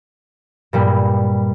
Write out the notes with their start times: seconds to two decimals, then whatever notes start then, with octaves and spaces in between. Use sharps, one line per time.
0.73 G2 A#2 G3